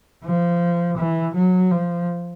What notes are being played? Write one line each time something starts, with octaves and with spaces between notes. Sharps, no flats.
F3
E3
F#3
F3